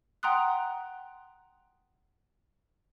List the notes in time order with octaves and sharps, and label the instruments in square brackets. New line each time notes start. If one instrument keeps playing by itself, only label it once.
[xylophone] F#5 G5 A#5 C6 D#6 F#6